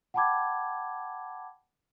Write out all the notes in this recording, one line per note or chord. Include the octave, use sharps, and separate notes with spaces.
F#5 G5 A5 B5 D6 G#6